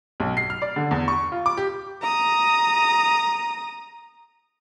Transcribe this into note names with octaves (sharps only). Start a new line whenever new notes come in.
B1
C7
F6
D5
D3
E2
C#6
F4
D6
G4
A#5 D#6